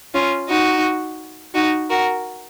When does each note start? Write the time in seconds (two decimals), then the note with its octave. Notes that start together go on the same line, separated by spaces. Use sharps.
0.14 C#4 F4
0.49 D#4 F#4
1.54 D#4 F#4
1.89 F#4 A#4